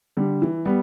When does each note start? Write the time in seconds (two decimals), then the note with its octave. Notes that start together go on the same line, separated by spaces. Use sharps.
0.17 D3 G3
0.42 E3
0.65 G3 B3